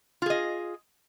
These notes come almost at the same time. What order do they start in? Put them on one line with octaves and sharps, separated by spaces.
F4 G#4 D#5